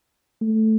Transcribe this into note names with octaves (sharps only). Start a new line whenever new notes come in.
A3